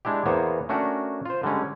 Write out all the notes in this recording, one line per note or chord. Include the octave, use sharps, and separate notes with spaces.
G#3 D4 E4 G4
E2 A#3 B3 C5 C#5
A3 C#4 D4 F#4 A#4
F4 C5
D3 G3 G#3 C#4